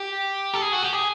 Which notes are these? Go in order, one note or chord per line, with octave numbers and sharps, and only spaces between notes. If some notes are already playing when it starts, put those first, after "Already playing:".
Already playing: G4
A4
G#4
F#4
G4
G#4